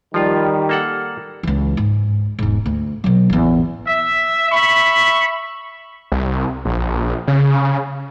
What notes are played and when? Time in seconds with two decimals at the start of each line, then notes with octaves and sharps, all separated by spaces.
0.14 D#3 F3 G3 F4
0.69 A#3 A4 F#5
1.43 C#2 E3
1.77 G#2
2.39 E1 G#2
2.66 D2
3.04 B2 F#3
3.30 A1 E2
3.87 E5
4.52 E5 B5 C#6
6.12 C2
6.65 A#1
7.28 C#3